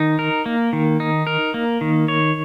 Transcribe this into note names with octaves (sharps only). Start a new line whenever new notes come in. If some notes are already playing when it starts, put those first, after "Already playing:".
Already playing: D#3 D#4
A#4
A#3
D#3
D#4
A#4
A#3
D#3
C#5